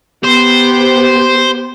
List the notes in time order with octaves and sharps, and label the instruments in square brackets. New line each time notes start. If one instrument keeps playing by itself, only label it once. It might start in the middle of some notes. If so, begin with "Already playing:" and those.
[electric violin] B3 G4 [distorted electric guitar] C5